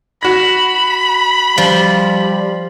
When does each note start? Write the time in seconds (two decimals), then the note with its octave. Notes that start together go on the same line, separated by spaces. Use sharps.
0.23 F#4 B5 A#6
1.58 F3 G3